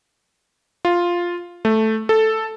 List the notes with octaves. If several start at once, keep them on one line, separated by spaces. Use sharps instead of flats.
F4
A3
A4